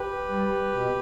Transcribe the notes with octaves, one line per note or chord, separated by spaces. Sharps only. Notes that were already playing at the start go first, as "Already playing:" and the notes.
Already playing: G4 B4
G3
B2